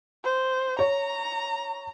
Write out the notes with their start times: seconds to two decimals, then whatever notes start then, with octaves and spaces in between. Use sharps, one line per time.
0.24 C5
0.79 C#5 A#5 C#6